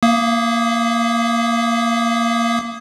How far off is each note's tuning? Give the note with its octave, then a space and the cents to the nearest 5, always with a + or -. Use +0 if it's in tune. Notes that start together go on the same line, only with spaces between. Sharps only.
A#3 +5 F5 -45 D#6 +0